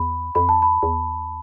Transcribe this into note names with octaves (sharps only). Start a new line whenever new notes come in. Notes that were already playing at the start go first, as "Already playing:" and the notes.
Already playing: E2 B5
F2 B5
A5
B5
E2